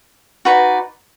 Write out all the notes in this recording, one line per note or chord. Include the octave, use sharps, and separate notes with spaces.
D#4 F#4 B4 D5